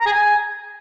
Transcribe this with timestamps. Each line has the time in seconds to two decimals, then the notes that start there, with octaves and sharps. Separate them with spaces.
0.01 A#5
0.06 G#4
0.12 G#5